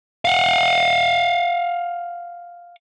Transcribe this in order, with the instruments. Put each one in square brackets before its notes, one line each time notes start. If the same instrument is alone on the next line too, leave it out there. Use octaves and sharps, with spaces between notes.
[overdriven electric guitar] F5 F#5